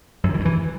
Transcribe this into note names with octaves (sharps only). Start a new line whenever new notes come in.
F#2
D#3
E3
G2
E3